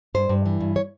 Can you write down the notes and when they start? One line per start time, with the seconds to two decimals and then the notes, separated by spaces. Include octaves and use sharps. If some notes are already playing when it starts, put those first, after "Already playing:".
0.14 G2 C5
0.29 G2
0.46 E3
0.60 G2
0.76 C#5